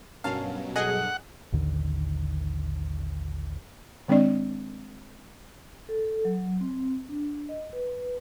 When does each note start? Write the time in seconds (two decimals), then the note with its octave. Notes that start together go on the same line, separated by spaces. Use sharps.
0.24 G2 B2 F#3 C#4 A#4 F5 A5
0.76 G#4 A4 D#5 F#5
1.52 A1 D#2 D3 D#3
4.08 D#3 G#3 C4 D4 D5 D#5
5.89 A4
6.05 A4
6.25 F#3
6.61 C4
7.09 D4
7.49 D#5
7.73 B4